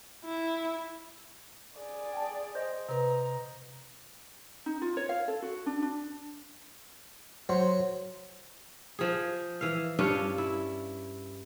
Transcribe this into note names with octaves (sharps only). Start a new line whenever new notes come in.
E4
G#4 D5
G5 A5
C5 D#5
C3 B4 A#5
D#4
F4
C#5
F5
A4
F#4
D4
D4
F#3 C5
F3 G#4
E3 F5
G2 C#4 D4 F4
E4